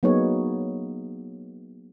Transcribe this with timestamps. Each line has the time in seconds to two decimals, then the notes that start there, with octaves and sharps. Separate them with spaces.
0.03 F#3 A#3 B3 D#4 G#4 C#5